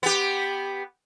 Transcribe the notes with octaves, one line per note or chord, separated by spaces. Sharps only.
B3 G4